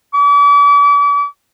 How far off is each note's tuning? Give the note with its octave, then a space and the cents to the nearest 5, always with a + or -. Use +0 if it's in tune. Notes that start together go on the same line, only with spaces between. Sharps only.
D6 -40